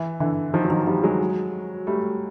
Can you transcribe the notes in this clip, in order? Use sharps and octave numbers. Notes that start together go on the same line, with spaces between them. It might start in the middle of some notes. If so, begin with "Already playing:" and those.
Already playing: E3
D3 E3
D#3 F3
F#3
D#3 F3
F3 G3
F#3 G#3
G3 A3